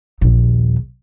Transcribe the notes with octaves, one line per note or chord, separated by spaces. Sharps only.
A#1 D#2